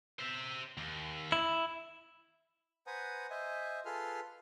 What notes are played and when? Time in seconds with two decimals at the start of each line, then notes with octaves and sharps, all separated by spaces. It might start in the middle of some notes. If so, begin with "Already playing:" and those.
0.19 C5 E5
0.78 D#2
1.32 E4
2.87 B4 C5 F#5 G#5 A#5 D#6
3.30 C5 D#5 E5 G#5
3.85 F4 G#4 A4 B4 C6 F6